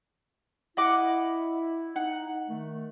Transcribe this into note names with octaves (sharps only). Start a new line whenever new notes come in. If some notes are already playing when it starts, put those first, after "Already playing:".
E4 D#5 F#5 D6
D#4 F#5
D#3 A3